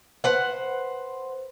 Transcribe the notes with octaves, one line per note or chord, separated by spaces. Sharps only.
B4 C5 F#5